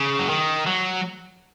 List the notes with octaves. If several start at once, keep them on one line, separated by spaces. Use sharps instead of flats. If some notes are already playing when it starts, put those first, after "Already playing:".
Already playing: C#3
F#3
D#3
F#3